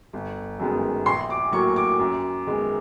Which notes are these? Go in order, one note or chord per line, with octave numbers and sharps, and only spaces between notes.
G1
F#2 D#3 G#3 B3
A#1 C6
D6
A2 F#3 A#3 C#6
D6
F#2
D#3 G#3 B3